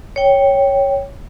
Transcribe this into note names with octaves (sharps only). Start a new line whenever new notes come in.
C#5 G5